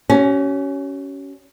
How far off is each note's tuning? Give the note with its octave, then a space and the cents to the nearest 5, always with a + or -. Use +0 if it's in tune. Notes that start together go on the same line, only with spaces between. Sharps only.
C#4 +10 F#4 +45